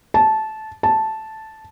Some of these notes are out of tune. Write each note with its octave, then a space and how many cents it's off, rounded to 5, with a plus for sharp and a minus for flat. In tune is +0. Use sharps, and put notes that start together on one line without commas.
A5 -15
A5 -5